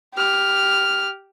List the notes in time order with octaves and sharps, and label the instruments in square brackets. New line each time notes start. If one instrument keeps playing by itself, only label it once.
[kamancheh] G4 F6